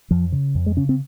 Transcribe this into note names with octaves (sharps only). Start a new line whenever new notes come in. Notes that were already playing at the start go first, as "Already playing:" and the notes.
F2 F3
C#3
F2
G#3
C#3 C#4
C4